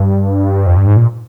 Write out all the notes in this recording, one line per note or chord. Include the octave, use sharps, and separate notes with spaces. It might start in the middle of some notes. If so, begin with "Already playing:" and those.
Already playing: G2
F2
G2
G#2
A#2